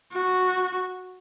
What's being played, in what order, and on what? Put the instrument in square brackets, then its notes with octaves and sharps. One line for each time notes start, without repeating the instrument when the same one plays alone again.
[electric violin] F#4